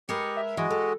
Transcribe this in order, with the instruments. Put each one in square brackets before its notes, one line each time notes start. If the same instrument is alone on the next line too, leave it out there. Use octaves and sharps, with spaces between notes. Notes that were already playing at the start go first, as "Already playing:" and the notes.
[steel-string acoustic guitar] G#3 A#4 B4 [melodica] G4 D#5 [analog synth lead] C#7
[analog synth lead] E5
[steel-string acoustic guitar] E3 [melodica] G#3 F#4 D#5
[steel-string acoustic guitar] G4 [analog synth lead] A4